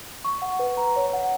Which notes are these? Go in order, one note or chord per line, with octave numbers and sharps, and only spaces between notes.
C#6
F#5
B4
A#5
C#5
F#5